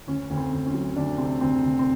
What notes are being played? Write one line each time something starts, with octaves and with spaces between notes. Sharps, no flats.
D2 C#4
D2
C4
D2
C#4
F#3
D2 D4
C3 C4
D2 C4
D2
C4